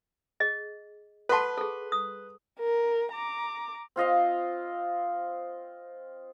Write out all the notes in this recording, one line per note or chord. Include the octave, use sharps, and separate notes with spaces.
G#4 D#5
A4 B4 F#5 A5 C6
G#4 A4
D#6
A#4
A#5 D6
C4 F4 D#5 F5